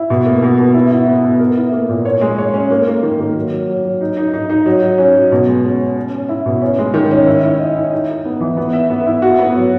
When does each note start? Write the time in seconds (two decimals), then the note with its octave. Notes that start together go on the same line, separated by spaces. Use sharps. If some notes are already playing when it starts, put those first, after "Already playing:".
Already playing: E4
0.10 B2
0.26 A#3
0.43 B2
0.59 B2
0.74 E4
0.92 E4
1.07 B3
1.24 B3
1.39 A#4
1.57 E4
1.72 A#3
1.89 A#2
2.05 C#5
2.21 G#3
2.38 C#5
2.54 C#4
2.70 A#3
2.86 A#3
3.03 D#3
3.19 A#3
3.35 F#3
3.53 F#3
3.68 F#3
3.84 F#3
4.01 D#4
4.17 D#4
4.33 D#4
4.50 D#4
4.66 F#3
4.82 F#3
4.98 C#4
5.14 F#3
5.32 B2
5.48 G#3
5.64 C#4
5.81 C#4
5.96 C#4
6.13 C#4
6.29 E4
6.46 B2
6.62 C#4
6.79 G#3
6.94 D#3
7.11 C#4
7.27 E4
7.43 E4
7.59 D#5
7.76 E4
7.93 D#4
8.09 D#4
8.25 B3
8.40 E3
8.57 B3
8.73 E5
8.90 B3
9.06 E4
9.22 F#4
9.39 B3
9.55 F#3